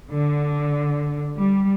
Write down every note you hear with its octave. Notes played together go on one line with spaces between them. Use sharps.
D3
G3